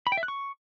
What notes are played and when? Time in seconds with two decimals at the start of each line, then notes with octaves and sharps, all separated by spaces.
0.07 B5
0.12 G5
0.17 E5
0.23 F#6
0.28 C#6